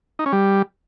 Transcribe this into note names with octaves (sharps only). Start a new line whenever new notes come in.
D#4
C#4
G3